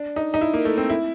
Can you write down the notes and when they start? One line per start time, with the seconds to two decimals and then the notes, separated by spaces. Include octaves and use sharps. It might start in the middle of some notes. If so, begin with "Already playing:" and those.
Already playing: D4
0.16 D#4
0.34 D#4
0.41 E4
0.54 A#3
0.65 A3
0.78 C4
0.90 E4